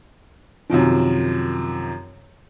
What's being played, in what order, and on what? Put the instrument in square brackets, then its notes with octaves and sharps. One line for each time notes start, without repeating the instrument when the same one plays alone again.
[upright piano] F#2 C3 D#3 F3